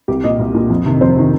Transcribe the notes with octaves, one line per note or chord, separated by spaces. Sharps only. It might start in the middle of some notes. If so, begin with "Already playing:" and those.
C2 G4
A#2 D#5
C2
A#2
F2
C3 D#3
F2 C5
C3 D#3